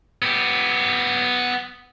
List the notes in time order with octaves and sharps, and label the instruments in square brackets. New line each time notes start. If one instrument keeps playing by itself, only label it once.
[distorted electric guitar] B3 G4